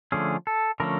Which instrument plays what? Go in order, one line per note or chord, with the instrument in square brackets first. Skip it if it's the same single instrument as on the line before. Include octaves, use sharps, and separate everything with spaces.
[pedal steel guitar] D3 F3 A3 C#4 G#4
A4
D3 F3 A3 C#4 A#4